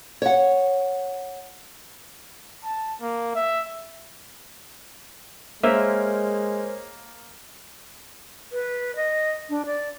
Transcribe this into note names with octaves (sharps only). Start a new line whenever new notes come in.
C#5 F#5
A5
A#3
E5
G#3 A#3 A#4 C5 C#5 E5
B4
D#5
D4
D5